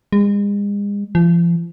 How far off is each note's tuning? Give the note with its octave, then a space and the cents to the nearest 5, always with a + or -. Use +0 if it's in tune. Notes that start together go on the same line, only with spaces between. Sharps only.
G#3 -40
F3 -40